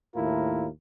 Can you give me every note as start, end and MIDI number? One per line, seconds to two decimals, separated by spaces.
0.15 0.67 39
0.15 0.67 45
0.15 0.67 64
0.15 0.67 65
0.15 0.67 70